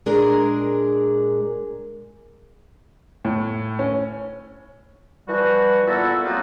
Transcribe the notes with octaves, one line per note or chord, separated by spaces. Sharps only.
A#2 G#3 D4 G#4 A#4
A2
C#4
E3 F3 G3 F#4
A#2 G3 B3 E4 F#4 A4
F#3 A#3 C4 D#4 F4 F#4